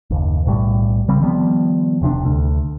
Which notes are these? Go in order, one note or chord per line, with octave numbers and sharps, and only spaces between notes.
F#1 D#2
B1 A2 G3
C#3 G3 C4
D#3 F3 G3 B3
E1 C3 C#4 D4
D2